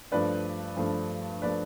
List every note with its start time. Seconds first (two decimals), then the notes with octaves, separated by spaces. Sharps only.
0.12 G2 F3 A3 B4 D5
0.77 G2 F3 A3
1.42 F3 A3 B4 D5